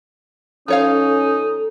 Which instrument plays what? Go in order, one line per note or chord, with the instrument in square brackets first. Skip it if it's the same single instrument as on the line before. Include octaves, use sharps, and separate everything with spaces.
[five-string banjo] F3 C#5 F5 [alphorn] C#4 [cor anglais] D#4 [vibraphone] A4